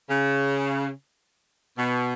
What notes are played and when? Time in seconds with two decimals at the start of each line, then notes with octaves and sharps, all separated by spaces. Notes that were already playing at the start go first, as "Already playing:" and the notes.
0.09 C#3
1.77 B2